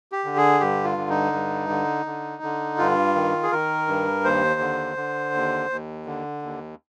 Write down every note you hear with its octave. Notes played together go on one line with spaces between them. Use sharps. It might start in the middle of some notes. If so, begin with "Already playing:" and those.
G4
D3
G#4
G2 G4
F4
D3
D#4
G2
D3
D3
D3
G2 F4
D#3
G#4
D#3 A#4
G2
D#2 C5
D3
D3
D#2
D#2
D3
D#2